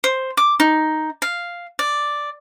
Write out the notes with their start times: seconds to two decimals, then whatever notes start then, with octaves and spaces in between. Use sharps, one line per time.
0.04 C5
0.37 D6
0.60 D#4
1.22 F5
1.79 D5